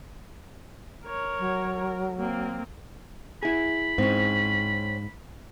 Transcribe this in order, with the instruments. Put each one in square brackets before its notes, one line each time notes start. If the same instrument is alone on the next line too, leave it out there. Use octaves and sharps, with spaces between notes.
[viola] A#4 C#5
[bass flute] F#3
[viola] A#4
A#3 C4
[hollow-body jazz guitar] E4 G#4 [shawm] B5
[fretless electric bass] G#2 [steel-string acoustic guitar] C4 C#4